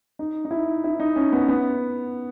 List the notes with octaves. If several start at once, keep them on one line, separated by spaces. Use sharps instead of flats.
D#4
D#4
E4
E4
D#4
C#4
B3
B3